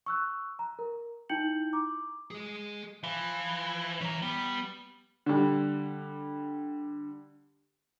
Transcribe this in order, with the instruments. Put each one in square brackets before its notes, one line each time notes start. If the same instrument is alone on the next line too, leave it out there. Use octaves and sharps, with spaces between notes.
[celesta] C#6 E6 F#6
A#5
A#4
D#4 E4 G5 G6 C#7 F#7
A#5 D6
[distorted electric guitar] G#4 D#5
[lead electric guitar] E3 [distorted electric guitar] C5 F5
[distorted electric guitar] E3 [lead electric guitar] C#4 A#4
[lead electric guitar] G3 [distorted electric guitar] B3
[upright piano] D3 G3